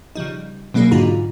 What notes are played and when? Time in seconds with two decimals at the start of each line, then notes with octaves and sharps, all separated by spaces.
0.15 C#3 F3 G3 D#4
0.74 B2 F#3 A#3 D4 G#4 C7
0.91 G#2 D3 D#4 F4 F#4 A#5